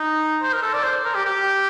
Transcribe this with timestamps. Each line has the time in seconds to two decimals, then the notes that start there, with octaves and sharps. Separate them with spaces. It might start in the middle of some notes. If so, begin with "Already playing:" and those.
Already playing: D#4
0.42 C5
0.53 A#4
0.63 A4
0.73 D5
0.83 C5
1.05 A#4
1.15 G4
1.26 G4